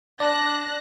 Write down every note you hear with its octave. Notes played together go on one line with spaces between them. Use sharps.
D4 D5 A5 F#6 A#6